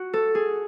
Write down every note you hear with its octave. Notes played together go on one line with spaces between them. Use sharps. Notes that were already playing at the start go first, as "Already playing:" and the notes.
Already playing: F#4
A4
G#4